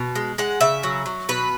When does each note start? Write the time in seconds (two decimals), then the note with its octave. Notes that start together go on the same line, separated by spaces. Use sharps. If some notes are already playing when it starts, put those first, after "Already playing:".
Already playing: B2
0.15 G#3
0.38 G#3 F#5
0.61 C#3 E5
0.83 F#3
1.06 F#3
1.29 B2 B4